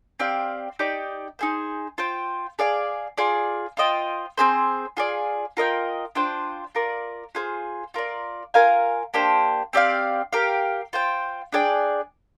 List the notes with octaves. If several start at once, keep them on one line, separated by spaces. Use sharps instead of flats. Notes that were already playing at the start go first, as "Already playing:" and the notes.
C4 G4 D5 F5
D#4 G4 D5 G5
D#4 G#4 C5
F4 C5 G5
G#4 D5 F5
F4 G#4 D5
F4 C5 D#5 G5
C4 D#4 G#4 C5
F4 G#4 D5
F4 A#4 D#5 G5
D4 F4 C5 G5
F4 A#4 D5
F4 G#4 C5
F4 A#4 D5
F4 A#4 F5 G#5
A#3 D4 G4 C5
C4 G4 D5 F5
G4 A#4 F5
F4 C5 G5
D4 G#4 D5 G5